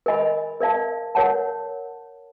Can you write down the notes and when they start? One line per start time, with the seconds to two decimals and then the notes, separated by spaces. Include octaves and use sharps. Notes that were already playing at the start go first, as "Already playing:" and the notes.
0.06 A#4 D#5 G#5 B5
0.60 A#4 D5 F5 A5
1.15 A#4 C#5 F#5 A5